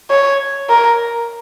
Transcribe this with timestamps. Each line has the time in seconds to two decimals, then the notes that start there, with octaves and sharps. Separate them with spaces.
0.10 C#5
0.70 A#4